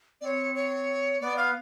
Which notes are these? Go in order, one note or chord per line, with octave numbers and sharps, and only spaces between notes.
C4 C#5 D5
C#5
B3 D5
F5